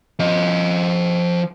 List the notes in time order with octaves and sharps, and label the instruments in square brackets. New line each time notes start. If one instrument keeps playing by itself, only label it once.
[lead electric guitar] F3 D#5